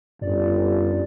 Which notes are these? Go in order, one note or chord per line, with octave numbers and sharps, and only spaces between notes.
G1 F#2 D5